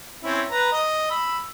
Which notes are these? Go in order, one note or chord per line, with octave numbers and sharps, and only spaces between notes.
C4 C#4 E4
B4 A#5
D#5
B5 E6